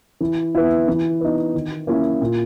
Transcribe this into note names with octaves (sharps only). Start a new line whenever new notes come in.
E3
B3 E4
E3
B3 D#4
D#3
A#3 C#4 E4
A#2